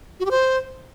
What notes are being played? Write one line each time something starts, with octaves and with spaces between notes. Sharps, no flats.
F#4
G4
C5